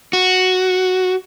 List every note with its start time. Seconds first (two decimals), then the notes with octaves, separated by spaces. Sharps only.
0.13 F#4